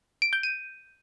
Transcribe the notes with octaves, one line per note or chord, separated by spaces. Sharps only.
D7
G6
D#7